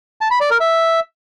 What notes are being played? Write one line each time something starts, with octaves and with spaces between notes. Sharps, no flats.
A5
B5
D5
A#4
E5